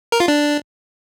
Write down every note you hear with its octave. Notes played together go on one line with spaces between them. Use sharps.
A#4
F4
D4